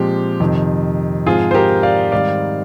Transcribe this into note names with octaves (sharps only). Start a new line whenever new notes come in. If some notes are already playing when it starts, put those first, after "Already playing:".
Already playing: A#2 F3 G#3 C4 G4
F2 C3 D#3
G#2 F3 C4 F4 G#4
C5
G4 A#4
D5 F5
G#2 D#3 G3 C4 D5 F5